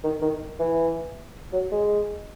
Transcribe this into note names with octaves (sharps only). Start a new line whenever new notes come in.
D#3
D#3
E3
F#3
G#3